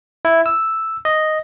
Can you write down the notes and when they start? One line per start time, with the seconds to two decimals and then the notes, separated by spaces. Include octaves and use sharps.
0.25 E4
0.46 E6
1.05 D#5